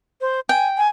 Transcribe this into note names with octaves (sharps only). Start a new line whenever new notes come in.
C5
G5 G#5
G#5